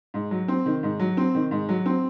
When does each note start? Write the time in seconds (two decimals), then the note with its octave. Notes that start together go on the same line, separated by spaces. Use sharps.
0.14 G#2
0.31 F#3
0.48 C4
0.66 D#3
0.83 G#2
0.99 F#3
1.17 C4
1.35 D#3
1.51 G#2
1.69 F#3
1.86 C4